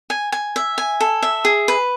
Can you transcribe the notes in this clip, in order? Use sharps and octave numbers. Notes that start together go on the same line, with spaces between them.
G#5
G#5
E5
G#5
A4
E5
G#4
B4